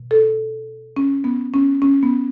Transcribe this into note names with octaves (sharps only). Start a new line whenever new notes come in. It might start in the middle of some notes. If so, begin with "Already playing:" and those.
Already playing: B2
A4
C#4
B3
C#4
C#4
B3